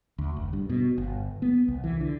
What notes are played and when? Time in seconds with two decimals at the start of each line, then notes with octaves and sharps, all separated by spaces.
0.18 D2
0.36 F1
0.53 G2
0.70 B2
0.98 G1
1.42 B3
1.68 C2
1.84 E3
2.01 D3